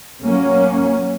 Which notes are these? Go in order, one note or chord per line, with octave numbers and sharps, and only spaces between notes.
F#3 A#3 C#4